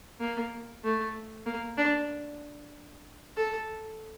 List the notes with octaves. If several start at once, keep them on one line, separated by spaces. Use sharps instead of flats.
A#3
A3
A#3
D4
A4